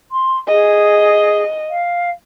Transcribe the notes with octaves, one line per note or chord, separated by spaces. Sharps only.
C6
G#4 D#5
F5